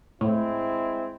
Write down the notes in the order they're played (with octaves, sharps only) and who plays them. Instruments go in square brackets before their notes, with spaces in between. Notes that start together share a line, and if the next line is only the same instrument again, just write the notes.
[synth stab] A2 [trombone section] G#3 C4 E4